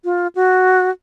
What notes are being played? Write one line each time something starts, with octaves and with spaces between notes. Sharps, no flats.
F4
F#4